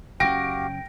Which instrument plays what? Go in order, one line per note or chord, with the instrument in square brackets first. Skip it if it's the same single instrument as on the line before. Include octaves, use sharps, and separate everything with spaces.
[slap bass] F#1 C#4 [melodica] F#4 G4 F5 [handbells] G5 [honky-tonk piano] A#6 D7